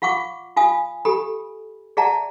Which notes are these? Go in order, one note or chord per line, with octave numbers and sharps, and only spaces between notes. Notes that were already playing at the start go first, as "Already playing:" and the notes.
F4 F5 F#5 C#6 D6
F4 F5 G#5 D#6
G4 A4 B5
G#4 D5 E5 F#5 A5 A#5